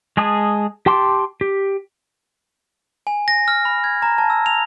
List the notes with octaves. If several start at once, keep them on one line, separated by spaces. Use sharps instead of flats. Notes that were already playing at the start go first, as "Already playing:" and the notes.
G#3 G#4 A5 D#6
G4 G5 A5 C6 D6
G4
G#5
A#6
F6
B5
G#6
A#5
A5
E6
F7